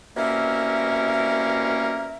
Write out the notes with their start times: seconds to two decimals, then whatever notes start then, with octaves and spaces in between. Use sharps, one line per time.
0.16 C2 B2 A#3 C#4 A#4 E5